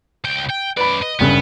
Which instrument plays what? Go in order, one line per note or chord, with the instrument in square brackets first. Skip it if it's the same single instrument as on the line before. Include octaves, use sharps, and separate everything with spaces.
[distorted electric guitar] C#2 G5
G5
[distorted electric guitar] F#2 D5 [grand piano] B4 B5
[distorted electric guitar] D#5
[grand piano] F#1 G2 C#3 [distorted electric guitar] B3